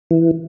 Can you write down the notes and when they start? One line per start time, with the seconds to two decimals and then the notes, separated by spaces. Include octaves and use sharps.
0.11 E3